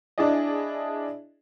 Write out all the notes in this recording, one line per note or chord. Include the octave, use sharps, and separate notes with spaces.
D4 E4 G#4 D5 D#5